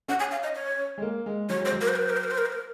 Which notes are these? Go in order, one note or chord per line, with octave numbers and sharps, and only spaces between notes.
C#4 F#5
G#5
F5
D#5
C#5
G#3
A#3
G#3
F#3 C#5
G#3 C5
F#3
A#4
C5
A#4
C5
A#4
C5
A#4
C5
A#4
C5
A#4